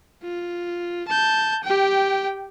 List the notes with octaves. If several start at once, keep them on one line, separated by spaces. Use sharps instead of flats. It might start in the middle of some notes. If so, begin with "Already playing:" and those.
F4
A5 G6
G4 G5